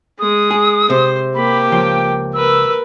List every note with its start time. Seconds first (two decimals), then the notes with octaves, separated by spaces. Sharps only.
0.20 G#3 D#6
0.51 G#4
0.90 C3 C5
1.35 A#3 G4 B5
1.72 C#2 F3 G5 C6
2.34 A#4 B4 E6